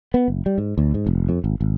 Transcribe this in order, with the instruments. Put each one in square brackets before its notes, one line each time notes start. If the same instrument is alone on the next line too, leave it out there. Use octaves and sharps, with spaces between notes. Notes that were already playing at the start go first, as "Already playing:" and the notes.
[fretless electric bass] B3
F#1
G3
G#2
D2
G#2
F1
F2
G#1
G#1